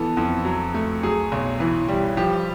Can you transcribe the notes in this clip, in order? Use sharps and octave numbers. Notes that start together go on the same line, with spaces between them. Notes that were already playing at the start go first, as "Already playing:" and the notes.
Already playing: E3 B3 A4
F2
F#3
A3
F#3 G#4
B1
E3
G3
F3 G4